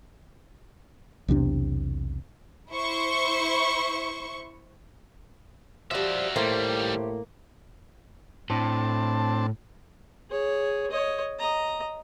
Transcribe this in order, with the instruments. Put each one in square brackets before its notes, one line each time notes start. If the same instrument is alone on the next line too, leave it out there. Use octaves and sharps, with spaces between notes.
[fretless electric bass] B1 E2 C3 D4
[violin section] E4 C5 C#6
[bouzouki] F3 G3 [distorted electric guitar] F#4 E5
[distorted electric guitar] D#2 G3 [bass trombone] A2 [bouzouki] A3 G4 C5 [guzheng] A#3
[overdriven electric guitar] A2 [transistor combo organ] C4 D4 A5
[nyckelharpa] G#4 C#5
C#5 D#5
D#5 A#5